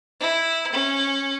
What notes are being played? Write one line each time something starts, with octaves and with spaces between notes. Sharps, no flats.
E4
C#4